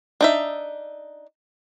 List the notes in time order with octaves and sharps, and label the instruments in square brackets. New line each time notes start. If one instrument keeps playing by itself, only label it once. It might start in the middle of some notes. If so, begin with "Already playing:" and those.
[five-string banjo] D4 D#4 E5